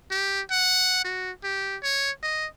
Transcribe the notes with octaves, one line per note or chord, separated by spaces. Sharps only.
G4
F#5
F#4
G4
C#5
D#5